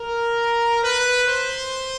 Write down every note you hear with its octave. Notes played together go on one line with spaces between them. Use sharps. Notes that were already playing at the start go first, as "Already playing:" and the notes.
Already playing: A#4
B4
C5